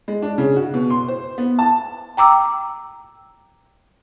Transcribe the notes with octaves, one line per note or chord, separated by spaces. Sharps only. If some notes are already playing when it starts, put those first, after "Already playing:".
G#3
D4
C#3
F#4
B2
C6
C5
B3
A5
G5 A#5 D6 E6